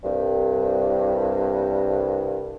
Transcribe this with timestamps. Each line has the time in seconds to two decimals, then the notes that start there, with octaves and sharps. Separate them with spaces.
0.04 C2 G2